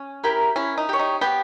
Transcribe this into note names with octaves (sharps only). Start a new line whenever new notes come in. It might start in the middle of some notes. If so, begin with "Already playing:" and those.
Already playing: C#4
E4 G4 A#4
C#4 E4
D#4
G4 C#5
D#4
B3 G4